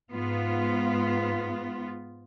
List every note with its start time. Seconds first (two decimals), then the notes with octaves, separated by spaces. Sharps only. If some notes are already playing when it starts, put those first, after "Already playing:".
0.12 G#2 B3 F4